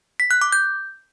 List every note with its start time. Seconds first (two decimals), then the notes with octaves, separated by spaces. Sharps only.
0.20 B6
0.31 F#6
0.42 D6
0.52 G6